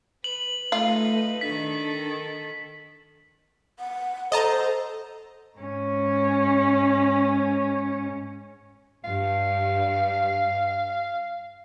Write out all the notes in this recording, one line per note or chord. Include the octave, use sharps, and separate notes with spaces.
B4 F#7
A3 D#4 F4 B4
D#3 D4 A4 B6
F#5
A4 C5 D#5 A5 A#5
G#2 C#4
G2 F5